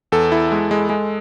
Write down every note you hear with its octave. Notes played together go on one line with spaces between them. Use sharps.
E2 A4
E4
G#3
G#3
G#3